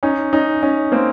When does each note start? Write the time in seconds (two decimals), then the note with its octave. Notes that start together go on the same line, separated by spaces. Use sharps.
0.03 C#4 D#4
0.33 C#4 D#4
0.62 C#4 D#4
0.92 A#3 C4